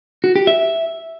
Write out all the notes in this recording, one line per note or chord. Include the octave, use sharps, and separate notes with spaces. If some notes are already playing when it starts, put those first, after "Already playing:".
F#4
G4
E5